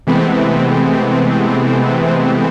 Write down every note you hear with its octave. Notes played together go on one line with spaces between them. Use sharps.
C3 E3 G#3 A3 B3 C4